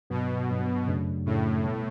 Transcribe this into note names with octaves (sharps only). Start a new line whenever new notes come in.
G2 B2 F#3 B3
G2 F#3 B3
F#2 C#3 F#3 A3 D4
F#2 A2 C#3 F#3 A3 D4
B2 G3 B3 E4